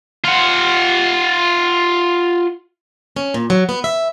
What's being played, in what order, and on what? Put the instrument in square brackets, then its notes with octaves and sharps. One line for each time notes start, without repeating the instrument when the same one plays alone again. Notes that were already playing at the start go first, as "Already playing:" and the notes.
[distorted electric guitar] F4 F#5
[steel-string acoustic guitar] C#4
A#2
F#3
B3
E5